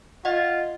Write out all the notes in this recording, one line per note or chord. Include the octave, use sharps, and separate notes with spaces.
F4 D#5 F#5